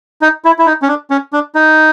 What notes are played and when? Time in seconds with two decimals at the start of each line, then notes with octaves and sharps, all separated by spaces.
0.22 D#4
0.45 E4
0.59 E4
0.66 D#4
0.82 C#4
0.88 D4
1.10 C#4
1.33 D4
1.55 D#4